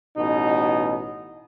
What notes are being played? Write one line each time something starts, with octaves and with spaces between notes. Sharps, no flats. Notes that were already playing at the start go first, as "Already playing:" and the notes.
A1 B2 D#4